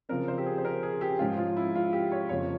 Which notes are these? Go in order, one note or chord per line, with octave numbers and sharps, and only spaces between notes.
C#3 F3 C4 A#4
C5
G4
G#4
C5
A#4
G#4
G4
G#2 F3 G#3 C#4 F4
F4
E4
F4
G4
C#5
F2 C#3 F3 A#3 C#5